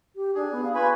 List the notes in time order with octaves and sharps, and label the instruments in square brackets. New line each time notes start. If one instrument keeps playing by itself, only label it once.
[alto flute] G4
[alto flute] D4 [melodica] G#4
[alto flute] B3
F5
[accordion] F4 G#5 B5 [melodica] B4 [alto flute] C#6